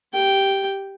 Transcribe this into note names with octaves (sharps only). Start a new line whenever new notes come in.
G4 G5